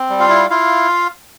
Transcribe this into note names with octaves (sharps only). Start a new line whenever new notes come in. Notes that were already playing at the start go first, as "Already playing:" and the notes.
Already playing: C4
G3
F4 F5
E4
E4 F4 F5